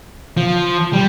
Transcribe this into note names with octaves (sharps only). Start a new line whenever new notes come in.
F3
G3